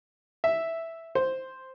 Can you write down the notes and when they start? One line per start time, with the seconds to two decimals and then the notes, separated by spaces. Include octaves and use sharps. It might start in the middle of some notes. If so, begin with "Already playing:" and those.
0.44 E5
1.15 C5